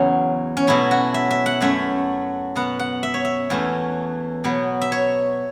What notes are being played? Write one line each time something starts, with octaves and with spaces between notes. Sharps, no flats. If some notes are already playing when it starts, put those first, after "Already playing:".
Already playing: E2 C#3 F#3 C#4
C#4
B2 F#3 A3 E4
F#4
E5
E5
F#5
F#2 F#3 A3 C#4 E5
B2 B3 F#5
F#5
E5
C#5
E5
E2 E3 A3 C#4
B2 F#3 B3
E5
C#5